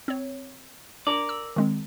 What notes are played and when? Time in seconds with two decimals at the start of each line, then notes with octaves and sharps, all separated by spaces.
0.08 C4 C#5
1.07 D4 A#4 D5
1.29 E6
1.56 D#3 G#3 C4